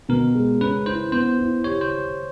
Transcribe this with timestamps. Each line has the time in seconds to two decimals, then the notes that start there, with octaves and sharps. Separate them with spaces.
0.09 B2 A#4
0.35 G#3
0.61 C#4 B4
0.86 E4 C5
1.12 B3 C5
1.39 E4
1.64 G4 C#5
1.81 C5